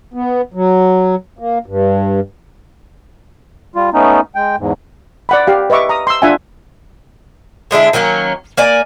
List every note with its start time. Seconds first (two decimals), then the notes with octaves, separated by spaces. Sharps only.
0.14 B3
0.54 F#3
1.39 A#3
1.66 G2
3.76 G3 F4
3.94 A3 B3 C#4 D#4
4.35 G#3 G5
4.59 E2 G#2
5.29 D5 F#5 B5
5.47 G4 F5
5.70 B4 D#5 E5 C#6 D6
5.89 A#5 D#6
6.07 C6 E6
6.22 D4 F4 E5 F#5 G#5
7.71 D3 G#3 D4 E4
7.93 D#3 F#3 A#3 C#4
8.57 A#3 D5 G#5